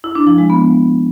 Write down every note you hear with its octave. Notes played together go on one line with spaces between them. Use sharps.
E4
D4
F3
G#3
B3